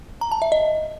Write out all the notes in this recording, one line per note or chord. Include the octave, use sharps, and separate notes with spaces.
A#5
A5
E5
D#5